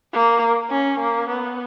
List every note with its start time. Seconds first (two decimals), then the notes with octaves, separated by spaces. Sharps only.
0.13 A#3
0.70 C#4
1.00 A#3
1.29 B3